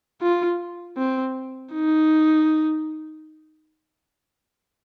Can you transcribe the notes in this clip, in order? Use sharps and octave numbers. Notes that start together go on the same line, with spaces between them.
F4
C4
D#4